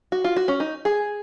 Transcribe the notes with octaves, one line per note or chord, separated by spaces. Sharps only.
F#4
F4
F#4
C#4
D#4
G#4